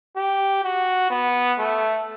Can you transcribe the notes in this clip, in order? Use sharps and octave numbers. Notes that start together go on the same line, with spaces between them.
G4
F#4
B3
A3